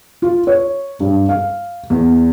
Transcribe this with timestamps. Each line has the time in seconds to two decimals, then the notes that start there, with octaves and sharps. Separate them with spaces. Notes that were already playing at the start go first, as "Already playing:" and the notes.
0.22 F4
0.47 C#5
1.00 G2
1.29 F5
1.90 E2